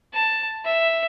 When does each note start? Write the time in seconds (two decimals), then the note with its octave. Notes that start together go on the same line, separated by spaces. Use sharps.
0.13 A5
0.65 E5